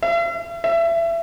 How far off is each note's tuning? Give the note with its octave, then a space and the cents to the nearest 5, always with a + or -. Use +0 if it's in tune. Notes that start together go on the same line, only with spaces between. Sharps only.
E5 +45
E5 +25